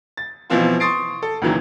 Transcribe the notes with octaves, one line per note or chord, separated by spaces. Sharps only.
A6
B2 E3 F3 C4 F4
C6 C#6 D#6 A6 C7 D7
A4
C#2 A#2 D#3 E3 F#3